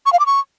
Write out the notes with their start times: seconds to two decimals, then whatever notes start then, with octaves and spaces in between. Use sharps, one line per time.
0.06 C#6
0.13 F5
0.20 D6
0.26 C#6